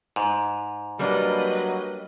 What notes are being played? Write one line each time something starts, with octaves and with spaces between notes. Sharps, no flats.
G#2
F#3 G3 A#3 D4 B4 D#5